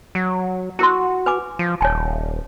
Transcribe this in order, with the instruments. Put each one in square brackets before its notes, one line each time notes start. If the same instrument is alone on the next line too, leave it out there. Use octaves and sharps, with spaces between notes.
[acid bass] F#3
[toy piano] E4 A#4 C6 [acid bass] F#4
[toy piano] B4 G#5 D6
[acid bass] F3
[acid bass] D#1 [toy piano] C#5 G#5 A5